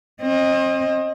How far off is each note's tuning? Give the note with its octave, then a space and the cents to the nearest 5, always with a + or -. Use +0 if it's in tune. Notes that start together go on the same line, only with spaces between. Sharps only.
C4 +35 D#5 -5